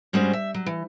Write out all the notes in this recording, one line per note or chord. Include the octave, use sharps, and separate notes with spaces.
G2 G3 G#3 C#4 F#4 C5
E5
F#3
E3